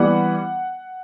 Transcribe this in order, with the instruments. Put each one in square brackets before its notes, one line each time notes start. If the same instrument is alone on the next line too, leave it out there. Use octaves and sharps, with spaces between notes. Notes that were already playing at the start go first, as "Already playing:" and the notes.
Already playing: [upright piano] E3 G3 B3 F#5